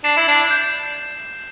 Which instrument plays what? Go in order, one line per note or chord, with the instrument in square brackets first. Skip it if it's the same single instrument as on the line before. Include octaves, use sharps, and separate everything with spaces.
[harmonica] D4 [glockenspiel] C7 E7
[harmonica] E4
D4
[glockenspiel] G6